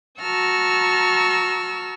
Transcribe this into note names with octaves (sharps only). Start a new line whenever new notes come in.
F#4 A5 A#5 C#6 E6 F6